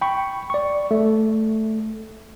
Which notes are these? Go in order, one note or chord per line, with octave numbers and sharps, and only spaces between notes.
G5 B5 C#6
D5 C#6
A3